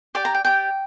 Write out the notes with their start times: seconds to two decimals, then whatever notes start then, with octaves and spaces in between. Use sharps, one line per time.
0.15 G4 D5 G5
0.25 A#5
0.34 G5
0.45 G4 D5 G5